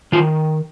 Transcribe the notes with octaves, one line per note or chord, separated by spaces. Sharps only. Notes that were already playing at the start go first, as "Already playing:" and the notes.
D#3 F4